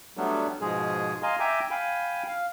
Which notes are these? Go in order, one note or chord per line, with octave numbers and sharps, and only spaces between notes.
F#3 G3 A3 B3 D4
G#2 B2 F3 G#3 G#4
D#5 F5 G#5 A#5 C6
E5 G5 G#5 A#5 D6
F5 G5 G#5 B5
F5